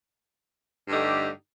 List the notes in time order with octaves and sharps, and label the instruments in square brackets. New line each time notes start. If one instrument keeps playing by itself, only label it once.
[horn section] G2 D3 A3 D#4 G4